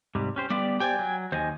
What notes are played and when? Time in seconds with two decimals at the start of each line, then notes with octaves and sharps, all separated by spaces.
0.15 G#2 C3 G3
0.36 C#4 G4 C5
0.50 G3 B3 G4 D5
0.80 G4 C5 D5 G5 G#5
0.99 F#3
1.32 D#2 C5 D#5 G#5